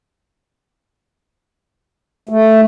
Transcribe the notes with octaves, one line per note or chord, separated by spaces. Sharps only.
A3